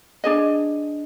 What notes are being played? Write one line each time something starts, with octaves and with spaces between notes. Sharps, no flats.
D4 G#4 D#5